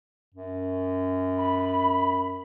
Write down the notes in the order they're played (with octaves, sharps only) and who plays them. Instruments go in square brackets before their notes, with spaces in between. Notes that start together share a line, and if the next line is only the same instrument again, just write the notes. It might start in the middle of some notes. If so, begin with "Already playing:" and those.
[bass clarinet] F#2
[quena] B5